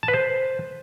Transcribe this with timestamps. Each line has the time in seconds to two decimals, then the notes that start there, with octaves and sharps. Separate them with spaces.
0.03 A5
0.08 B4
0.14 C5